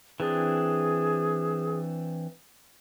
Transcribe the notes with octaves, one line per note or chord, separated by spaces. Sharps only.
E3 C4 D4 G#4